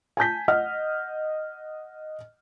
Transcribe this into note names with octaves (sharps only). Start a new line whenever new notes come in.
G#5 A5 G6 B6
D#5 F#5 F6